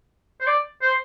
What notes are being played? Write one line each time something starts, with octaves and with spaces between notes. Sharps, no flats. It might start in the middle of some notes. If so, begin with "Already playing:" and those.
C5
D5
C5